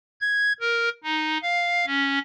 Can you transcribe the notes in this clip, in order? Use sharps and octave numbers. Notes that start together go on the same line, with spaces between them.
G#6
A#4
D#4
F5
C#4